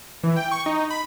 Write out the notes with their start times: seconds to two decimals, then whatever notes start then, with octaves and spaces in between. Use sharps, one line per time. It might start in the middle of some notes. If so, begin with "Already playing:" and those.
0.24 E3
0.36 G5
0.51 C#6
0.66 D#4
0.90 B5